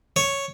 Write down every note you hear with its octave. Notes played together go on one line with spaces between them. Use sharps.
C#5